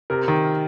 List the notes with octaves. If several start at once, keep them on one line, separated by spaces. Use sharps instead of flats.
C3 A#4
D#3